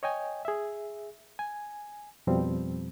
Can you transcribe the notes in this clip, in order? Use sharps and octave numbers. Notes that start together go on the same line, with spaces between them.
C#5 D#5 G5 G#5
G#4 E5
G#5
F2 B2 F3 G3 C4